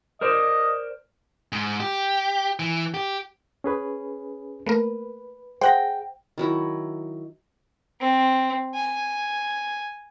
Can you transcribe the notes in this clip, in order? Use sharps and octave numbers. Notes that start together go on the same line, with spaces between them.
A#4 C5 D5 D#5
G#2
G4
E3
G4
C#4 G#4 B4
A3 A#3 A#4 B4
G#4 C5 F#5 G5 A#6
D#3 F#3 E4
C4
G#5